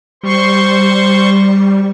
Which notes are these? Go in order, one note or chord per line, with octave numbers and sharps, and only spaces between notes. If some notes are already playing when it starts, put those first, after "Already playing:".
G3 C5 C6 C#6